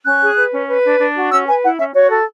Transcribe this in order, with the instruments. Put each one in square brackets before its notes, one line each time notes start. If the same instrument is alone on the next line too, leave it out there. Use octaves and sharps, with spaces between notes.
[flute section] C#4 F#6
G#4
B4
C#4
B4
D4
D4
F#4
C#4 E6
B4 G#5
E4 F#5
C#4 E5
F#4 C#5
A4